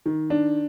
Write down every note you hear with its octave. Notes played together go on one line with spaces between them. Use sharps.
D#3
D4